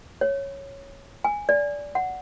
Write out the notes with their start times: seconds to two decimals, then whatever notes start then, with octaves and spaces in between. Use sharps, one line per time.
0.21 C#5
1.24 G#5
1.49 D5
1.95 F#5